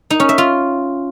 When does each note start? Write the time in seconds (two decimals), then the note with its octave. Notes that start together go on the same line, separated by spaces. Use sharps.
0.10 D#4
0.20 C#4
0.29 E5
0.38 F4